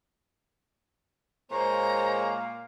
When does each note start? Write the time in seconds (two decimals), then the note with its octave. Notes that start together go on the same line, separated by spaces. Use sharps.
1.52 A#2 G#3 A#3 C5 C#5 A#5